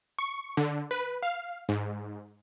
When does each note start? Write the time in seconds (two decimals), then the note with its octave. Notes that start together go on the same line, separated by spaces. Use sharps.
0.19 C#6
0.57 D3
0.91 B4
1.23 F5
1.69 G#2